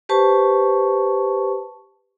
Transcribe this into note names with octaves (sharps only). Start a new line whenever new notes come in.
G4 B4 C5 A5 C#6